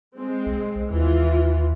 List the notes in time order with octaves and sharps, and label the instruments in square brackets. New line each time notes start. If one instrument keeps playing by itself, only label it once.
[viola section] G#3 C4
[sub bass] B1
[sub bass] D#2 [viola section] E3 F4